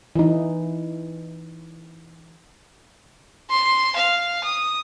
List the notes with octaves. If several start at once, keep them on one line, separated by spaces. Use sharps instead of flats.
E3 D#4
C6
F5
D#6